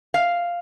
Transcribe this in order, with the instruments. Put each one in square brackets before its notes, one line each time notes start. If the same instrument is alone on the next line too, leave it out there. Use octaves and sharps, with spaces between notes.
[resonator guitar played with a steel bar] F5